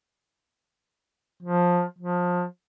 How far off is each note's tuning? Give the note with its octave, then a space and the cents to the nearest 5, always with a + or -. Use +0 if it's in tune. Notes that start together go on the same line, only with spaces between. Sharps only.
F3 +15
F3 +25